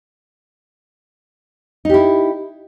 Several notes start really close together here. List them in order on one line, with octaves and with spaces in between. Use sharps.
D#4 G4 E4